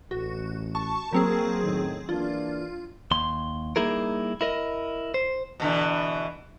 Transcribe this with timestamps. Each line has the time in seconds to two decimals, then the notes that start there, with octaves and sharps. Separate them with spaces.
0.11 A1 F#4
0.75 A5 C#6
1.13 F#3 A#3 C4 G#4 A#4
1.63 F#2 A2 D#3
2.09 E3 A#3 D4 F4
3.11 D#2 C6
3.76 G3 A#3 D#4 E4 G#4 A#4
4.41 E4 A#4 D#5
5.14 C5
5.60 B2 D3 E3